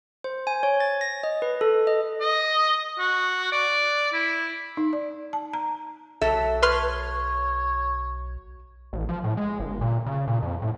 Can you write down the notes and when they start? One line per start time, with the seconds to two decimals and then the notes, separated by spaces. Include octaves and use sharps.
0.24 C5
0.47 G#5
0.63 C#5
0.80 A6
1.01 A#6
1.23 D#5
1.42 B4
1.61 A4
1.87 D#5
2.20 D#5
2.99 F#4
3.52 D5
4.13 E4
4.77 D#4
4.93 D5
5.33 A5
5.54 A#5
6.21 B1 F#3 A4 E5
6.62 B4 C#5 C6 F6
8.93 A1
9.09 F3
9.24 A2
9.37 G#3
9.60 G1
9.81 A#2
10.06 C#3
10.28 A#2
10.43 F2
10.62 A2